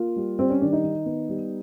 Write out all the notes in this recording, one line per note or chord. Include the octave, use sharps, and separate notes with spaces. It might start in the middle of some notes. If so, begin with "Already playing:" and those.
Already playing: A#3 F4
G3
G3 C4
C#4
D#3 D4
D#4
D#3
B3
G3